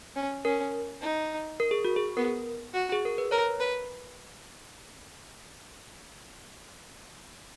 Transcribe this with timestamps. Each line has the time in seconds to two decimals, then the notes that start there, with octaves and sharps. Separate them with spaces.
0.16 C#4
0.45 C#4 A#4
1.01 D#4
1.60 A#4
1.71 G#4
1.85 F#4
1.96 G#4
2.17 B3 A#4
2.74 F#4
2.92 G#4
3.05 A#4
3.18 B4
3.31 A#4 C#5
3.60 B4